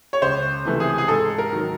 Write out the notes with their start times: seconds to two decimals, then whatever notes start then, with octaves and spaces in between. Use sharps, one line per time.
0.13 C#5
0.22 C#2 C5
0.65 C3 E3 A3
0.80 G#4
0.98 G#4
1.08 G#2 A4
1.38 A#4
1.52 D#3 F#3